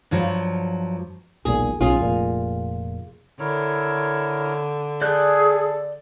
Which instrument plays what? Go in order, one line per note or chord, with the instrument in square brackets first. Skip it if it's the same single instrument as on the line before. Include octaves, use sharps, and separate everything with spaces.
[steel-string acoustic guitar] G2 F3 F#3
[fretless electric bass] E1 B1 A#2 [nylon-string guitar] G#4
[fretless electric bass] B1 C#4 [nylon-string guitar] F4 G#4
[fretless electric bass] F1 A#2
[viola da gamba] D3 [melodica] E4 A#4 C#5
[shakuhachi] G#4 [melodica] A4 [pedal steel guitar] D5 F#6 G6